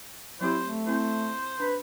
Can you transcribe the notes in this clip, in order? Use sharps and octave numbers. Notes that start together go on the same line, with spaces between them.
F#3 C4 E4 G4 C5
A3
C4 E4 C5
D4 B4